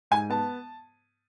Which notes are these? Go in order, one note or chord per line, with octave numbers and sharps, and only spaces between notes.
G#2 G#5
B3 A5